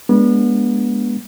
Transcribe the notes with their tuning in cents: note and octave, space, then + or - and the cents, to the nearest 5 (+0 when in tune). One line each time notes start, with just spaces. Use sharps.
G#3 +0 B3 -35 D4 -20